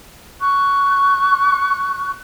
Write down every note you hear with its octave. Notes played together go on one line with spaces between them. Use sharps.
C#6 F#6